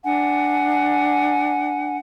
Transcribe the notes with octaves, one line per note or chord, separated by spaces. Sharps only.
D4 F#5 G#5